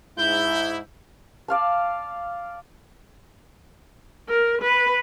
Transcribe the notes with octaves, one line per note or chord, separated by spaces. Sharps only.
G#2 E4 G6
D5 F5 A5
A#4
B4